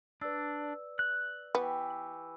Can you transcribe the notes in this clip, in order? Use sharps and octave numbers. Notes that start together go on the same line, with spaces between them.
D4 B4 D5 E6
F#6
E3 B3 G4 C#6